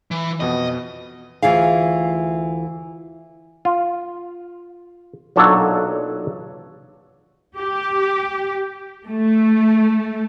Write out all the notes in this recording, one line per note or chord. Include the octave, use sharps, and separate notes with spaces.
E3
F2 B2 B3 D#5
D2 E3 F4 G#4 F5
F4
B1 A#2 F#3 D4 A4 C#5
G4
A3